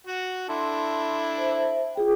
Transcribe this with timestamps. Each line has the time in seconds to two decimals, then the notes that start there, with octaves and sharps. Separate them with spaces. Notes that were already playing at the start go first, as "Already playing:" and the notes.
0.07 F#4 F#5
0.49 D4 E4 A4 C6
1.38 C5 E5
1.95 F4 G#4 G5